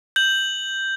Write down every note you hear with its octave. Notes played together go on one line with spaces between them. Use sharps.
G6 F#7